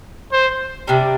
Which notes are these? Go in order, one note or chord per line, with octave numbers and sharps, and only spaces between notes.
C5
C3 G3 D4